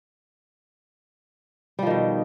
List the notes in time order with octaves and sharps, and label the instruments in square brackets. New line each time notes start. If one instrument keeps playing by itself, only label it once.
[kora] G3
F3
D#3
B2